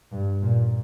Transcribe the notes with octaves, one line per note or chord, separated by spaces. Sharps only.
G2
A#2